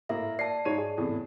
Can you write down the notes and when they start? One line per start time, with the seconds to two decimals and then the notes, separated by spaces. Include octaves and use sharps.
0.09 A2 A#3 E5
0.39 D5 A5 C7
0.65 G#2 C#5 D#7
0.78 G#4
0.97 E2 A2 C3